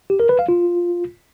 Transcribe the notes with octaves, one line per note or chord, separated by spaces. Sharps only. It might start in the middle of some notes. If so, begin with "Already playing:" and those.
G4
A#4
B4
F5
F4